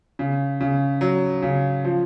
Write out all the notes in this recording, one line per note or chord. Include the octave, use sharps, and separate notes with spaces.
C#3
C#3
F#3
C#3
F3